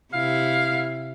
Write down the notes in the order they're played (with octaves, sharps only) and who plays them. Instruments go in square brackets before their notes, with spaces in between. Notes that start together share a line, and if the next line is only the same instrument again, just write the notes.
[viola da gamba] C3 E4 [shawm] F5